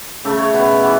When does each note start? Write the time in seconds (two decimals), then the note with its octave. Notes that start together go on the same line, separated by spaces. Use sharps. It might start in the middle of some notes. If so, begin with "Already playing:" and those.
0.25 C#3 A3 E5
0.39 C#5
0.53 B2 B3 B4
0.83 E3 B3